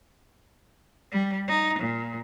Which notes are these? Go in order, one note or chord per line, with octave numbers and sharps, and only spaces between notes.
G3
D#4
A#2